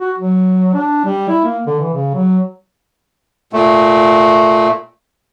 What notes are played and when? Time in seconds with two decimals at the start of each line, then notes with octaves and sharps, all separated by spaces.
0.01 F#4
0.18 F#3
0.74 D4
1.05 G3
1.29 E4
1.45 A#3
1.67 D3
1.80 E3
1.93 C#3
2.14 F#3
3.53 A#2 A3